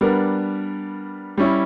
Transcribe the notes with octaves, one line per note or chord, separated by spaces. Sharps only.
G3 B3 D4 A#4
G3 C#4 E4